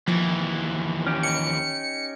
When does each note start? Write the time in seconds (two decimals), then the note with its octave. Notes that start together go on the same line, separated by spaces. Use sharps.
0.08 D#2 E3 F3
1.06 C#4 D#4 G4
1.23 C#7